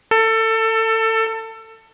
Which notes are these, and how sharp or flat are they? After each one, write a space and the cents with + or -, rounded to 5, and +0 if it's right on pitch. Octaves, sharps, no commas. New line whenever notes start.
A4 +25